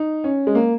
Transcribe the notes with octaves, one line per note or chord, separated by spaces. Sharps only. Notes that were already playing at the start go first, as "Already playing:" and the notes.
Already playing: D#4
C#4
G#3
A#3